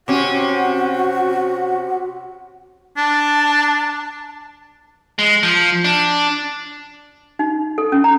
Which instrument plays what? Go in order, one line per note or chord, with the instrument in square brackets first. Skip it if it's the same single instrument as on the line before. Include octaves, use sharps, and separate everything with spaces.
[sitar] C3 C#4 [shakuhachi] F#4 [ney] F#5
[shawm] D4 [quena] A5
[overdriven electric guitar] G#3
F3
D4
[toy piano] D#4
A4
C#4
A#5